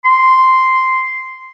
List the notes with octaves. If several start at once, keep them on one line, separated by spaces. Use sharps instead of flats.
C6